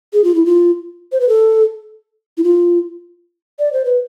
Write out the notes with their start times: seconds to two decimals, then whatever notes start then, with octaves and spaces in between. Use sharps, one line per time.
0.13 G#4
0.24 F4
0.35 E4
0.46 F4
1.12 C5
1.20 B4
1.29 A4
2.37 E4
2.44 F4
3.59 D5
3.73 C5
3.85 B4